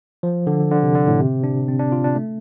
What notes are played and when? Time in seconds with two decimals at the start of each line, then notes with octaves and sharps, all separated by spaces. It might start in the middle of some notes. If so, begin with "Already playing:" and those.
0.23 F3
0.47 D3
0.72 D3
0.83 C3
0.95 D3
1.08 A2
1.20 C3
1.44 D4
1.68 C4
1.79 D4
1.92 F4
2.04 D4
2.15 A3